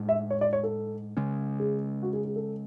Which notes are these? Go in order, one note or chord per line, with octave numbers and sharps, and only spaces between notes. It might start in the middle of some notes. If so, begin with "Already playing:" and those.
Already playing: A2 G#3 D4
E5
C#5
D5
C#5
A4
C#3 G#3 C#4
G#4
F#4
G#4
G#4
A4